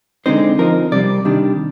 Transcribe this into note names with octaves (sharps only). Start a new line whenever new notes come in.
D3 G#3 C4 D#4 C5
F3 C4 D#4 A#4
C3 G3 C4 D5
C3 D#3 G3 D4